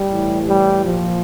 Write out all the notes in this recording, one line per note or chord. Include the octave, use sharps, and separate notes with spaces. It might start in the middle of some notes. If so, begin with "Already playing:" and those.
Already playing: G3
A2 E3
G3
A#2 F3